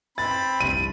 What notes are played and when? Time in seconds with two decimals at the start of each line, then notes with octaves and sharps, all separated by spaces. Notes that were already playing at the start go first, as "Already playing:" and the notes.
0.18 C4 B5 A6
0.60 F1 C2 G2 D#7